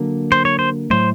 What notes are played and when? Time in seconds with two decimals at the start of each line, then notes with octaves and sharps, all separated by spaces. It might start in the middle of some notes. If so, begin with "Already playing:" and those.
Already playing: D3 F#3 A#3 D4
0.32 C5
0.45 C#5
0.59 C5
0.90 A2 F#3 A3 C5